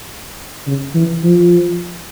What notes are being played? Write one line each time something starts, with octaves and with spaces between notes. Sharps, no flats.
C#3
E3
F3